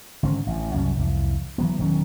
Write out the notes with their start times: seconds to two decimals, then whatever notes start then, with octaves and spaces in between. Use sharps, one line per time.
0.23 G#1 D3 C4 C#4
0.47 A1
0.74 C2 F#2 C#4
0.98 C2 F2 E3
1.58 E3 F#3 B3
1.79 E1 D#3 F#3 C#4